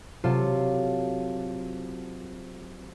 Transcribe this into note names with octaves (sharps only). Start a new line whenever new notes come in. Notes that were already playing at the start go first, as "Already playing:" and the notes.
C3 F#3 F4 A4